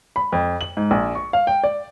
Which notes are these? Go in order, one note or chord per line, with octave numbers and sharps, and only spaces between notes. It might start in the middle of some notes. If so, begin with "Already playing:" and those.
B5
F2
F#7
G#2
A#1
C#6
F5
G5
D5